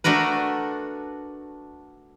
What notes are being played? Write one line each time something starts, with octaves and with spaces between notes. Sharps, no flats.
A3 D4 F#4 A#4 B4